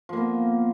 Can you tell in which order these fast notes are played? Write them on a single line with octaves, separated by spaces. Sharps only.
F3 A#3 B3